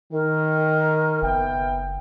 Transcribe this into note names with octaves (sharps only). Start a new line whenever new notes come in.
D#3 A#4
F#1 B3 E5 G5